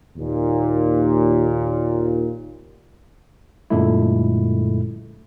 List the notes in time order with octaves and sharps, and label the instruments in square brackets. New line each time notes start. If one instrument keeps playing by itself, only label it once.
[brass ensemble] D#2 A#2
[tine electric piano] F#2 A#2 D3 G#3 A3 E4